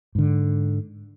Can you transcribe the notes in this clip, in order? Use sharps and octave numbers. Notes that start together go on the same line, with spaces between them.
G#2 D3